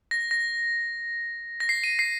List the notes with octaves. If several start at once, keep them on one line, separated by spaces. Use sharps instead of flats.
A#6
A#6
A#6
C7
D#7
C7